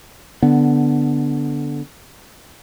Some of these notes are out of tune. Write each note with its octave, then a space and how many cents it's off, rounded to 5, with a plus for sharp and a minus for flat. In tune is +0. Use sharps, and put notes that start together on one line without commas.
D3 +0 B3 +0